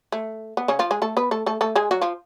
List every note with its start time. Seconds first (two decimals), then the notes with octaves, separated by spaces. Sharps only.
0.12 A3
0.57 B3
0.68 C#3 C#4
0.79 F3 F4
0.91 G#3 G#4
1.02 A3 A4
1.17 B3 B4
1.31 A3 A4
1.46 A3 A4
1.61 A3 A4
1.76 G#3 G#4
1.91 F#3 F#4
2.02 F3 F4